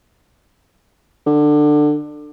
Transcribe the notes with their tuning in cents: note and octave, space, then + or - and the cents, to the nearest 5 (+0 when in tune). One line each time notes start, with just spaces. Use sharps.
D3 +20